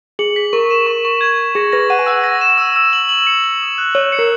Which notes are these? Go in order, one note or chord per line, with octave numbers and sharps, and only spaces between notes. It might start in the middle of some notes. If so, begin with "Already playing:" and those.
G#4 F#7
B6
A#4 C#6
E7
C#6
C#6
G#6
G#6
G#4 A#6
B4 A#6
F#5 D#7
G#5
F#5 E6
A#6
E7
E6
E6
F#7
F#7
C#7
F#7
D#6
F#6
C#5 E6
C#7
A#4